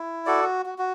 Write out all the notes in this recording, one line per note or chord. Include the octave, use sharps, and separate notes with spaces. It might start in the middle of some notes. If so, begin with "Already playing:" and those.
Already playing: E4
F#4 A4 D5
F#4
F#4